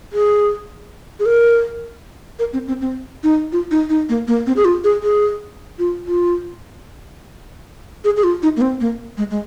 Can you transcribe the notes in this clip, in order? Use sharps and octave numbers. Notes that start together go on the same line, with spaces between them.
G#4
G#4
A#4
A#4
C4
C4
C4
D#4
F4
D#4
D#4
A#3
A#3
C4
G#4
F4
G#4
G#4
F4
F4
G#4
G#4
F4
D#4
A#3
C4
A#3
G#3
G#3